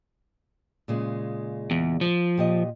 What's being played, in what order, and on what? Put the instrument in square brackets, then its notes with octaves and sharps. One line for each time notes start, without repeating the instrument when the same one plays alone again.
[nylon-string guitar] A#2 C#3 G#3
[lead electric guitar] E2
F3
[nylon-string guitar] A#2 G4 D#5